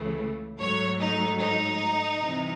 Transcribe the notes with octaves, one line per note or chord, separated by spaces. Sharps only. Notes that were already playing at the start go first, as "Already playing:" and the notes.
Already playing: C#2 C#3 E3 A3
G#2 F#3 A3 C#5
D#4
D#4
C2 C3 E3